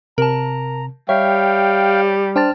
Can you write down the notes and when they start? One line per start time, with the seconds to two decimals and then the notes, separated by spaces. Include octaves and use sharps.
0.18 C3 A#4 A5 A#5
1.09 G3 C#5 E5 F5 G5
2.36 D4 C5 G5 A5 F6 A6